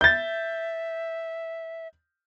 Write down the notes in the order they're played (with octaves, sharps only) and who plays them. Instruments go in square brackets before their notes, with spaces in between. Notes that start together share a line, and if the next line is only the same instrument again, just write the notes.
[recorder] E5 [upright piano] G6 A6